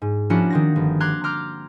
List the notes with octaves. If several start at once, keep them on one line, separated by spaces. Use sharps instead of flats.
G#2
F3 A#3 C#4 D4 E4 F#4
D#3 C4 A#6
G1
A#5 C6 D6 F#6 G#6
A#5 C6 D6 F6 G6